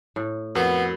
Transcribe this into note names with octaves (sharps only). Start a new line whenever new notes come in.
A2
F2 B3 F#4 A#4 B5